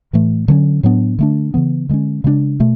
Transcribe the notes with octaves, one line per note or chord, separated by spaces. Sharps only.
A2 E3 A3
D3 F#3 A3 C#4
A2 F#3 B3 D4
D3 A3 D4
C#3 E3 B3
D3 G#3 C#4
C#3 G#3 B3 D4
B2 A3